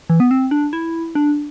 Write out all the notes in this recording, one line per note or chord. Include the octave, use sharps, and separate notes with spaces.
E3
B3
C4
D4
E4
D4